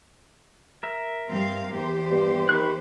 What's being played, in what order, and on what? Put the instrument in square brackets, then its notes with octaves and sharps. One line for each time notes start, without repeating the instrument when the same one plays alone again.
[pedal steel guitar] A#4 E5
[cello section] G2 C4 F5
E2 G4 C5
[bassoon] G2
[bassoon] D#3 [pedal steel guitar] B5 C#6 F#6